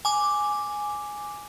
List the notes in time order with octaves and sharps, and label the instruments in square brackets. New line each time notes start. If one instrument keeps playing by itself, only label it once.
[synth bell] G#5 D6